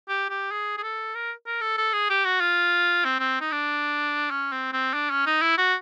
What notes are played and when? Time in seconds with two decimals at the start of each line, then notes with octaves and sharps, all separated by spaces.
0.08 G4
0.30 G4
0.51 G#4
0.77 G#4
0.83 A4
1.14 A#4
1.46 A#4
1.61 A4
1.78 A4
1.93 G#4
2.10 G4
2.25 F#4
2.40 F4
3.05 C4
3.19 C4
3.41 D#4
3.52 D4
4.31 C#4
4.52 C4
4.73 C4
4.94 D4
5.11 C#4
5.26 D#4
5.42 E4
5.58 F#4